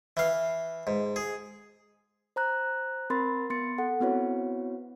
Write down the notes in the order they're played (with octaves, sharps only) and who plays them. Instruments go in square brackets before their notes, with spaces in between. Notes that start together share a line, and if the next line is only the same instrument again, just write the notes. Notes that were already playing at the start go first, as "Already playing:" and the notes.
[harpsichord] E3 F5
G#2
G#4
[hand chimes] C5 A#5 F#6
C4 A#4 B5 C6 A6
B3 C6 A6 C#7
A4 F#5
B3 C4 E4 F#4 B4 C#5